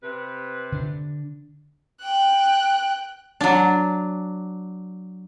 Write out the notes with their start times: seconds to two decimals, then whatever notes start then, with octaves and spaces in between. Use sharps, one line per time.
0.03 C3 B4
0.72 D3 D4
2.02 G5 F#6
3.41 F#3 D4